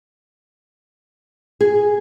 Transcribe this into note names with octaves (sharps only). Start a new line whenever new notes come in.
G#4